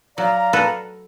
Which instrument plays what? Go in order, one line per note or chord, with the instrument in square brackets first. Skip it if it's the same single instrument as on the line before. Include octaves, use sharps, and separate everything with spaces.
[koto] F#3 [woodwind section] D5 F5 A#5
[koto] F#4 A4 B4